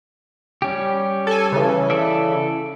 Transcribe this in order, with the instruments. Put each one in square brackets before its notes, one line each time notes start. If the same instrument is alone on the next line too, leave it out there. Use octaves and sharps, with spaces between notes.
[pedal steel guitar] G3 C#4 G4
[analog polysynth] A4 G#5
C#3 E3
[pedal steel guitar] A4 D5 E5